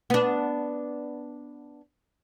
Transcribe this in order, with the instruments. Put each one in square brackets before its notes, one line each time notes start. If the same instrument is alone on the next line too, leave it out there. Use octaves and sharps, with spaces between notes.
[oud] B3 D4